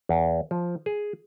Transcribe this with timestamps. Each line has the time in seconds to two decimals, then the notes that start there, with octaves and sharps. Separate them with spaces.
0.09 E2
0.51 F3
0.86 G#4